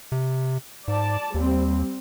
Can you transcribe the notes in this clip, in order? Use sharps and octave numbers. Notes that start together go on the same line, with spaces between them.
C3
G#2 D5 A5
D#2 G3 C4